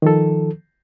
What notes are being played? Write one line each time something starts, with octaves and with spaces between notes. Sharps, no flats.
D#3 F3 A4